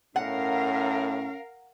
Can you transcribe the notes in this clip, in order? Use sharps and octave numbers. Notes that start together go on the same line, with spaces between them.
A2 C#4 A#4 F5 F#5